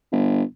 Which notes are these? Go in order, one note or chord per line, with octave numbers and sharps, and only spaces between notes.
G1